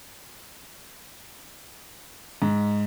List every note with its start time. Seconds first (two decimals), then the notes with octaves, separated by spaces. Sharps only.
2.42 G#2